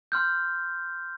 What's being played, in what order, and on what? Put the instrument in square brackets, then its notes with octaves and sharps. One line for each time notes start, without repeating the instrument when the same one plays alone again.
[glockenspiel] C6 F6 G6